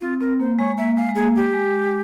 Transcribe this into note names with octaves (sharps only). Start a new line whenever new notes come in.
C4 F4
C4 A#4
A#3 C5
G#3 C#5
A#3 E5
G#3 F5
G#3
A#3 G#4
G4
G#3